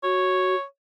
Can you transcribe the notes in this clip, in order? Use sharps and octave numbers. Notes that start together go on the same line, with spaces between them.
F#4 C#5